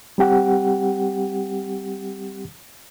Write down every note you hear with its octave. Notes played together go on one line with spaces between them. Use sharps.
G3 C4 G4 F#5